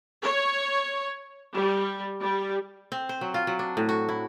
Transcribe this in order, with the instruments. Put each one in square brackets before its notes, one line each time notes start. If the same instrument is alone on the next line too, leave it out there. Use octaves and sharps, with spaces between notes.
[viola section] C#5
G3
G3
[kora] C4
C5
F#3
F4
F#3
D4
A2
F#4
E4